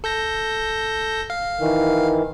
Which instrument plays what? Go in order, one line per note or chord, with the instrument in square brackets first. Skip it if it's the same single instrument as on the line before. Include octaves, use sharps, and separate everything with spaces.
[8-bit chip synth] A4 G6 A#6
F5
[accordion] D#3 E3